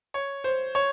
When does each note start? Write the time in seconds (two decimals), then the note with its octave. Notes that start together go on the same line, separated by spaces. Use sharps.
0.14 C#5
0.44 C5
0.75 C#5